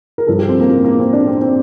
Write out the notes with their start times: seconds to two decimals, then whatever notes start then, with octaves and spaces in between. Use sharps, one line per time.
0.18 A#4
0.27 G2 F3 A4
0.38 G4
0.49 C4
0.60 A#3
0.70 A#3
0.85 A#3
0.99 C4
1.13 D4
1.27 C4
1.42 C4